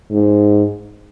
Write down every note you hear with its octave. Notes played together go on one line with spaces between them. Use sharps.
G#2